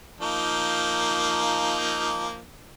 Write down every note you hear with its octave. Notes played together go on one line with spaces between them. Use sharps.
F3 A#3 D#4